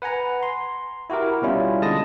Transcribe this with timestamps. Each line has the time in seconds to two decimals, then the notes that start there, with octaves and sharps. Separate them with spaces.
0.02 B4 F#5 G#5 A#5
0.43 C6
1.10 E4 F#4 G4 A#4
1.42 B2 G3 C#4 E4 F4
1.82 D3 G#3 A5 D#6 A#6